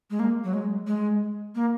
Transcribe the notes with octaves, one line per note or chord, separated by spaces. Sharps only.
G#3
A#3
F#3
G#3
G#3
A#3